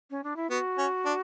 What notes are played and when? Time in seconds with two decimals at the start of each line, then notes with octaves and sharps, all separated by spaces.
0.10 C#4
0.24 D4
0.36 E4
0.50 B3 F#4
0.78 C#4
1.05 D4